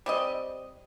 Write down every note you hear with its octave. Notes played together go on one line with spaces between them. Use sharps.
G3 C4 D#5